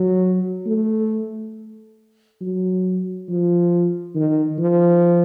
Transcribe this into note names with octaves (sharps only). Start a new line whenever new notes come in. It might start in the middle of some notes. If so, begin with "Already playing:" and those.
Already playing: F#3
A3
F#3
F3
D#3
F3